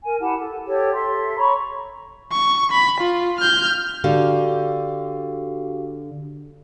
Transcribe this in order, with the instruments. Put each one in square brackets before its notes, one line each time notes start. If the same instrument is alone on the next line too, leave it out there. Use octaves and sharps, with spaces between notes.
[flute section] A#4 G#5
E4 G4 F#5 A5
A4
G4 A4 C#5
A4 E5 C6
C#5 A#5 B5 C#6
[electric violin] C#6
B5
F4
F6 G6
[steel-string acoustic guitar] D3 [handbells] F#4 G4 F5